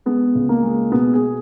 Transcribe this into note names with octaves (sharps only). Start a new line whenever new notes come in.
G#3 B3
C#2
A#3
G#3
B2 B3
G#4